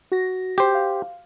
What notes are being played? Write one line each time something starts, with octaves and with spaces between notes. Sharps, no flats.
F#4 A#6
G4 C5
F5